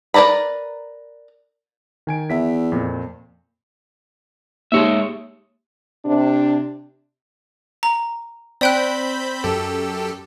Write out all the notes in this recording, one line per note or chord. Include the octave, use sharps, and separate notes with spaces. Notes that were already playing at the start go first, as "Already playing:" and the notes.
A#4 B4 D5 A#5 B5
D#3 G#5 D7
E2 E5 B6
F2 A#2
G#3 A#3 D#4 G4 C#5 E5
C3 D4
A#5
C4 D5 G5 B5 F#6 G6
F#2 G4 A4